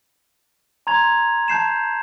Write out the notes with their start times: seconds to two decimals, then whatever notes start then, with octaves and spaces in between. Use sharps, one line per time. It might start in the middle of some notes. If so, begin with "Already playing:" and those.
0.87 A#5 C6 G#6 F7
1.48 A5 G6 C7 E7